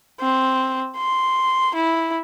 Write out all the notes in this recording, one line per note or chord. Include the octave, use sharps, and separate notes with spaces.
C4
C6
E4